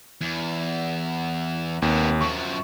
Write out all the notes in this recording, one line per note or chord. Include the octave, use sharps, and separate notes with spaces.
E2
D#2 C3 B3
F#2 F3 C#6